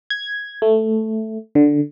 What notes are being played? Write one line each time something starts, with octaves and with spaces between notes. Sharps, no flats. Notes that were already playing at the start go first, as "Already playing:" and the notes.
G#6
A3
D3